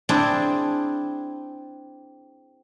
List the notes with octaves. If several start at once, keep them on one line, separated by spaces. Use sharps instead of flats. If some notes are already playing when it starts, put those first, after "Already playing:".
C4 D4 E4 G#4